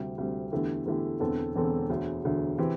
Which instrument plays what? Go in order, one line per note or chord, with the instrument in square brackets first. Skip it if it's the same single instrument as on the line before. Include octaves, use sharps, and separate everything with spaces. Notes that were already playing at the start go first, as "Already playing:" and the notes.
Already playing: [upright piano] D2 C3 G3
D2 C3 G3
E2 D3 A3 E4 G4
E2 D3 A3 E4 G4
E1 E2 D3 C4 A4
E1 E2 D3 C4 A4
E1 D2 D3
E1 D2 D3
C3 E3 C4 G4